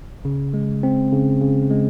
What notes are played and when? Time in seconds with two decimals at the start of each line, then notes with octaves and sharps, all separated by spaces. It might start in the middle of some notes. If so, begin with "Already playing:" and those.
0.25 C#3
0.54 G#3
0.83 C4
1.12 C#3
1.41 C#3
1.71 G#3